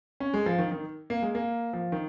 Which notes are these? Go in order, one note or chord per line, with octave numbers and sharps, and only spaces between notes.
C#4
G#3
F3
D#3
D#3
A#3
G#3
A#3
F3
D#3